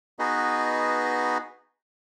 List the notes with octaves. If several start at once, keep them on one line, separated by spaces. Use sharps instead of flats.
B3 D#4 F#4 G#4 B4 D#5